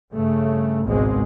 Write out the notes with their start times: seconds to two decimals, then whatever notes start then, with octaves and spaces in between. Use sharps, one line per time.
0.11 G2 C#3 A3
0.85 G#1 C#2 G#2 B2 G#3 C4